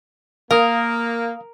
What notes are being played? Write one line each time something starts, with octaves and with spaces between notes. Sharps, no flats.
A#3 A#4 F5 D#6